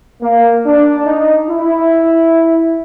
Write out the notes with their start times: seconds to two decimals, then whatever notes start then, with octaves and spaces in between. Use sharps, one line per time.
0.21 A#3
0.66 D4
1.06 D#4
1.49 E4